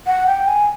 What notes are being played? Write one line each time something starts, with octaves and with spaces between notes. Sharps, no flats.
F#5
G5
G#5